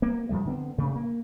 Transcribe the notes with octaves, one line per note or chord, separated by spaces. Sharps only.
A#3 B3
F#2 F3 G3 A3
D3 B3 C4
C3 A3 D4
A#3